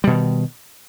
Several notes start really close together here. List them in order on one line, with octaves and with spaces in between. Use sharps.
G3 B2 D#3